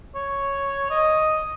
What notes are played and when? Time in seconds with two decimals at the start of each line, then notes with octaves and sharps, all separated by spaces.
0.15 C#5
0.90 D#5